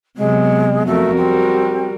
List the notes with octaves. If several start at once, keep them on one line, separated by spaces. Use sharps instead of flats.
C3 F#3 G#3 B3
F2 A3 F#4 A#4
G3 C4